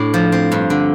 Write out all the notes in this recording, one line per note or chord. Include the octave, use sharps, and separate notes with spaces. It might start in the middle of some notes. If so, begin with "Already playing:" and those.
Already playing: A2 D4
F3
C4
G2
D3